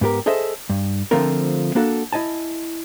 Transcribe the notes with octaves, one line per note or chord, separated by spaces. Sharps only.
G#2 B3 G4 A#4
G#4 A4 C5 D#5 E5
G2
D3 F3 A3 C4 F4 A#4
A#3 D4 F#4 A4
E4 D#5 G#5 A5